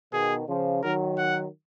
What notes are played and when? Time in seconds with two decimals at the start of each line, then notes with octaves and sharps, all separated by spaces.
0.12 B2 D#3 G#4
0.48 C#3 F3
0.82 D#3 F#3 A#4
1.18 F#5